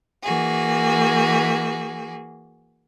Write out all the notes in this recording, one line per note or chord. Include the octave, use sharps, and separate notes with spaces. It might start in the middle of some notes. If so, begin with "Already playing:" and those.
E3 A#3 F#4 G#4